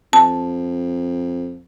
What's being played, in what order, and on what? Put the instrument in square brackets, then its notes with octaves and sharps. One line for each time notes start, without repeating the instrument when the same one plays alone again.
[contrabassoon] F2 [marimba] A5